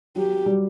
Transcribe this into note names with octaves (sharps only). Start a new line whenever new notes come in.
F#3 G4
G3